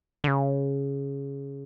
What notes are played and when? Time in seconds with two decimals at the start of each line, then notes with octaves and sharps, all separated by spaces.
0.24 D3
0.28 C#3